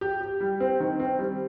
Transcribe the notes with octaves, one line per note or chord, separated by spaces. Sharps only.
G4
G4
G3
C4
D#3
C4
G3